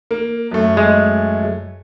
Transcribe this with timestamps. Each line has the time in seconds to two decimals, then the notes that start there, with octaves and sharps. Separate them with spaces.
0.11 A#3
0.51 F#2 A3
0.77 G#3